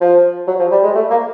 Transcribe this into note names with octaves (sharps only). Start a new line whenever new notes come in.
F3
F#3
F3
G3
G#3
A3
A#3